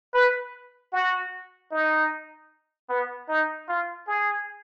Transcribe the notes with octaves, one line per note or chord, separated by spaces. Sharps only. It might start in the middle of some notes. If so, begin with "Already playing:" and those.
B4
F#4
D#4
B3
D#4
F4
G#4